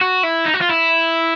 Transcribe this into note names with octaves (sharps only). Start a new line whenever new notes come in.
F#4
E4
D#4
F#4
F4
E4